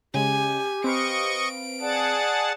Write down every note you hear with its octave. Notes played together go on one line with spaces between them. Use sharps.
C#3 G#3 G4 G#5
C4 B4 D#5 F5 C#6 D7
G#4 D5 F#5 A5